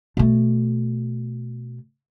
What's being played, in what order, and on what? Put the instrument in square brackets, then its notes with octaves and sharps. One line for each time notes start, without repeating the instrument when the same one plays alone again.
[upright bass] B2 A3